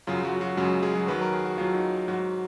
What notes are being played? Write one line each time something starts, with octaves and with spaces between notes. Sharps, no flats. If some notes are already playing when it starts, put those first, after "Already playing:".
F#2 C#3 F#3 F4
F#3 F#4
F#3 F#4
F#2 C#3 F#3 G#3 G#4
G#3 G#4
F#3 F#4
D#2 D#3 F#3 B4
A#4
G#4
F#4
D#2 D#3 F#3 F4
D#4
G#2 F#3 F#4